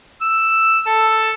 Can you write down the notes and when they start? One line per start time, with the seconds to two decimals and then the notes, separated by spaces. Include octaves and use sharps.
0.21 E6
0.86 A4